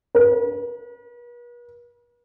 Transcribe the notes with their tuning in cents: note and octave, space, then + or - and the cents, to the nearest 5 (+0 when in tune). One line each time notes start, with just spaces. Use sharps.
B4 -45